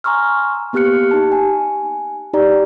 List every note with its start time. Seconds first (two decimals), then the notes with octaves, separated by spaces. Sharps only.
0.04 G#5 A#5 C6 C#6 E6 F6
0.73 A#3 B3 G4 F6 F#6 C#7
1.11 D#4 G4 A5
1.32 G#5
2.33 D#4 G4 D5 A#5